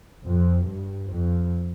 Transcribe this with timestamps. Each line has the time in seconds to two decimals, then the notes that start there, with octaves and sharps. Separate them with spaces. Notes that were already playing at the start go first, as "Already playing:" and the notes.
0.24 F2
0.67 G2
1.09 F2